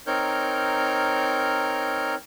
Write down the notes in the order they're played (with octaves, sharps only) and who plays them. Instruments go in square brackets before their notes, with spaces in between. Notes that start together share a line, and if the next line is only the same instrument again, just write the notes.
[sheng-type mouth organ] C4 D#4 A#4 C#5 F6 G6